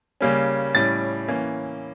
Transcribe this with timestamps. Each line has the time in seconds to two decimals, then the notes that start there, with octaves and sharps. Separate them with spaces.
0.21 C#3 G3 A#3 C#4
0.75 A2 G3 C#4 A6
1.28 E3 A#3 C#4